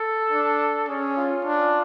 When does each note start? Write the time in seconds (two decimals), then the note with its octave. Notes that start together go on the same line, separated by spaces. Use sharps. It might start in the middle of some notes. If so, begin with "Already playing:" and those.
Already playing: A4
0.32 D4
0.89 C#4 G#4
1.17 F4
1.45 D4